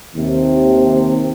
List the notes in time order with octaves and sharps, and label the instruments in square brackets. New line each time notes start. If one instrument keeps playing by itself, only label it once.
[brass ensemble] D#2 C3